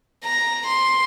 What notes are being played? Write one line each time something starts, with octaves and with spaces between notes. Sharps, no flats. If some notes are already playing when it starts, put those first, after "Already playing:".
A#5
C6